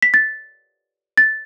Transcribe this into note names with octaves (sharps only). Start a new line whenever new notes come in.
B6
A6
A6